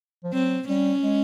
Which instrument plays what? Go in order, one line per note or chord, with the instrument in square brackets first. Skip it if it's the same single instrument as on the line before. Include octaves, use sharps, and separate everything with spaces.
[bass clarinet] F3
[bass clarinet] F#3 [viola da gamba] C4
[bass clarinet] G3 [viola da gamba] C#4
[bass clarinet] G#3